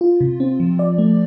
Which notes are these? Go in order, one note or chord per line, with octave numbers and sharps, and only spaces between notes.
F4
C3
C4
F3
D5
A3